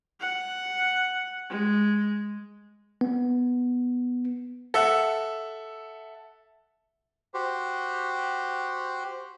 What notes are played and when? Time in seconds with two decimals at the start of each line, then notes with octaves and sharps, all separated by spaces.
0.20 F#5
1.50 G#3
3.01 B3
4.74 A4 E5 F#5
7.34 F#4 G4 C5